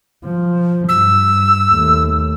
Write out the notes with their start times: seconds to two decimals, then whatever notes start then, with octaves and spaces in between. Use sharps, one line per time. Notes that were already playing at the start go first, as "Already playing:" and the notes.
0.25 F3
0.89 G2 E6
1.73 D#2 A3